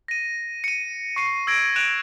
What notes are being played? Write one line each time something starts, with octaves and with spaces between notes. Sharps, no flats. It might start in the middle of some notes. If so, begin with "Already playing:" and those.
A#6 D#7
C#7 D#7
C#6 C7 C#7 D#7
E6 G#6 A#6 D7
F#6 D7 E7 F7